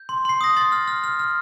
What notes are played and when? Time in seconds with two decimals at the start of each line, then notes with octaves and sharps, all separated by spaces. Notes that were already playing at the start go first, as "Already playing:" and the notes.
Already playing: G6
0.09 C6
0.25 C6 C7
0.41 D#6 A#6
0.57 C6 A6
0.72 F6
0.88 F6
1.04 F6
1.19 F6